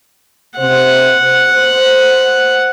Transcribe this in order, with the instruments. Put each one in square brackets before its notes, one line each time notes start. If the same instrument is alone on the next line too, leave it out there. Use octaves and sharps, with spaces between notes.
[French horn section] C3 C5 [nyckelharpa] F#5
[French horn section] C5